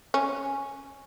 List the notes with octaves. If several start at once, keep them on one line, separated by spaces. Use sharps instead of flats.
C#4